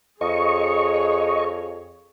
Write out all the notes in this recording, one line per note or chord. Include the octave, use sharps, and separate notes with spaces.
F2 G#4 C#5 D#5 C#6